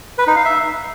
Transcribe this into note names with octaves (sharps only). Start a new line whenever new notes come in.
B4
D#4
F5
E5